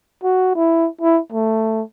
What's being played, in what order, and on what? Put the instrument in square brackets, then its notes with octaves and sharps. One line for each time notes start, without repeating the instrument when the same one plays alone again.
[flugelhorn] F#4
E4
E4
A3